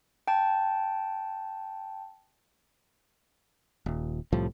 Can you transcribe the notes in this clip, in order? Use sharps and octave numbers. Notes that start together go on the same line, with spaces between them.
G5 A5
D#1
C2 A2 F3 G3